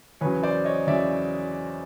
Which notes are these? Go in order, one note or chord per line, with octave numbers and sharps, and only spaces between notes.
E2 C#3 F#3 B4 C#5
C5 D5
C#5 D#5
E2 C#3 F#3 D5 E5